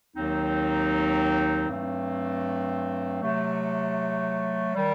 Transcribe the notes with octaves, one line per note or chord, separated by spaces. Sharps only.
D#2 D#3 F#3 C4 D#4
G2 F#3 A3 C4
C3 F#3 A3
D#3 G3